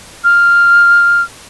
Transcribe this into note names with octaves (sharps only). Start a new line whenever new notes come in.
F6